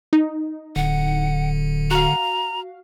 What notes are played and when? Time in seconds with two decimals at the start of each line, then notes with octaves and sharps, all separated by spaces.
0.13 D#4
0.76 D1 D3 F#5
1.91 F#4 F5 A#5